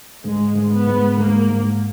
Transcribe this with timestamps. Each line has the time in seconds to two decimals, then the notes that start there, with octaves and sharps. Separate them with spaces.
0.23 G#2 G#3
0.55 G#2
0.71 B3
0.87 G#2
1.17 G#2 A#3
1.49 G#2